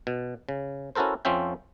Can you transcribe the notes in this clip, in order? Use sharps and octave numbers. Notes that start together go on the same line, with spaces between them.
B2
C#3
C#4 E4 F#4 A4 A#4 C5
F2 F3 C4 C#4 E5 G5